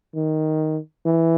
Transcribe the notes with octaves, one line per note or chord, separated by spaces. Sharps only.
D#3
E3